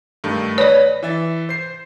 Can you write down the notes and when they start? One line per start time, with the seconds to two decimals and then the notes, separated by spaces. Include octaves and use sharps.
0.24 G2 D#3 A3
0.58 B4 C#5 D5 B5
1.03 E3 E5 A6
1.49 C5 C7